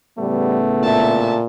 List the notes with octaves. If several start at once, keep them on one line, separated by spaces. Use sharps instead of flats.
A2 C#3 G3 A3 B3
A#2 E5 A5